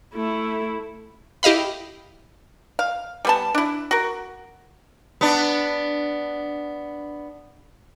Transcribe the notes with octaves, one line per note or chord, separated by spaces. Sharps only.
A3 E4
E4 G4 D#5 F5 B5
F5
G3 B3 A5
D4 E4
F#4 A#4
B3 D4